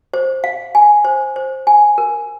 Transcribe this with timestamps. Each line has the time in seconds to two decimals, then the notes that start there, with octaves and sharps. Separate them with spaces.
0.14 C5
0.44 F5
0.75 G#5
1.05 C5
1.36 C5
1.67 G#5
1.98 A#4